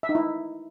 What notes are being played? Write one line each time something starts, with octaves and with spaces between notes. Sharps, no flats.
E5
D#4
E4